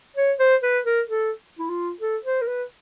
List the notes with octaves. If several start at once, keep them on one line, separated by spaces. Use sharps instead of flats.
C#5
C5
B4
A#4
A4
E4
F4
A4
C5
A#4
B4